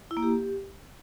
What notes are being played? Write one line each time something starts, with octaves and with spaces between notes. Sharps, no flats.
E4
A#3
G4